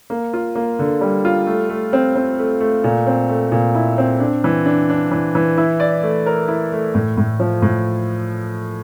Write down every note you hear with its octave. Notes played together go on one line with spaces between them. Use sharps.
A#3
F4
A#3
D3
G3
F4
A3
A3
C4
C4
A3
A3
A#2
C4
A3
A#2
E4
C4
D4
E3
D4
D4
E3
E3
E4
D5
A3
A#4
E4
A3
A2
A2
F3
A2